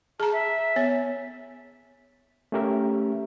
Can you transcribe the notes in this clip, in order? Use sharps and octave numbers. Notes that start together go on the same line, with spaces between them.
G#4 A5 A#5
E5
B3 C#5
A3 C#4 G4 A#4 E5